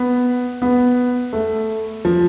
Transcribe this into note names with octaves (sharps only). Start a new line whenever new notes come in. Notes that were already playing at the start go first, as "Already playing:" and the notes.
Already playing: B3
B3
A3
F3